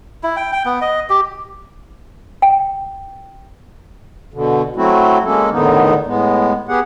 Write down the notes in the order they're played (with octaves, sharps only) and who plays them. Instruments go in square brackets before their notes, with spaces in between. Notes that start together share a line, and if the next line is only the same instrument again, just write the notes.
[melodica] E4
G5
G5
B3
D#5
G4
[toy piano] G5
[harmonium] B2 D3
F#3 A3 C4 E4 F#4
G#3 A#3 C#4 A4
E2 A2 D3 D#3 B3 D#4
A2 G#3 B3
B3 G4 G#4 F#5